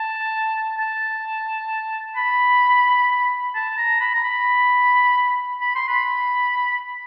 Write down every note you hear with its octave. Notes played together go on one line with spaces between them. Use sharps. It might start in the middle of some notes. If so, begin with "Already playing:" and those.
Already playing: A5
A5
B5
A5
A#5
B5
A#5
B5
B5
C6
B5